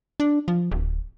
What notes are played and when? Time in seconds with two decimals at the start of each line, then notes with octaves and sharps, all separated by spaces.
0.20 D4
0.48 F3
0.71 D1